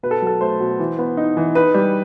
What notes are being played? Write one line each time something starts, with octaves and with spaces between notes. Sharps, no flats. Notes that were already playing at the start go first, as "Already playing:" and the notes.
B2 B4
A4
F#3 A4
A3 C5
B2
E3
B3
D#4
E3
D#4 B4
G3